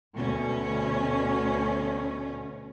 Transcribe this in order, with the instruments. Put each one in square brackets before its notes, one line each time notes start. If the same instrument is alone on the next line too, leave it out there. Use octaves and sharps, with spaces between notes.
[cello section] D2 B2 C#4